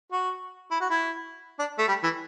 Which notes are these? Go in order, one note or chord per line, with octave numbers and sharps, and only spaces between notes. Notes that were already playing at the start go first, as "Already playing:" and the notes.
F#4
E4
F#4
E4
D4
A3
G3
E3